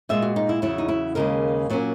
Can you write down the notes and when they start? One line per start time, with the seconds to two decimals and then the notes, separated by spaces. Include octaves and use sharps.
0.09 A#2 G#3 B3 E5
0.22 F#4
0.36 D#4
0.49 E4
0.62 E2 C#3 F#3 E4
0.78 D#4
0.88 E4
1.15 D#2 C#3 G#3 A#4
1.70 A#2 F#3 A#3 C#4